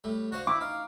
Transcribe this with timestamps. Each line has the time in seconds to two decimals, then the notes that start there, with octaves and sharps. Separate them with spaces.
0.04 A2 G3
0.32 D4 F#4 C5 F5
0.47 E4 D6
0.61 D#4 F5